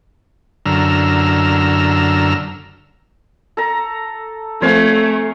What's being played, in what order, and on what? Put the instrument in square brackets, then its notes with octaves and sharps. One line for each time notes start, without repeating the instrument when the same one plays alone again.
[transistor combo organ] F#2 D3 A#5 E6 F6
[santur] A4 A#5
[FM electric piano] F3 C4 [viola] A3 [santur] C#5 F5 G#5